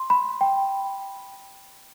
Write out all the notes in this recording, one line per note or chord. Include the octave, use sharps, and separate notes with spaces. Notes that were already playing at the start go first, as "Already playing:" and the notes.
Already playing: C6
B5
G5